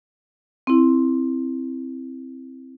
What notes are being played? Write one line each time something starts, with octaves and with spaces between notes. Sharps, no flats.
C4 E4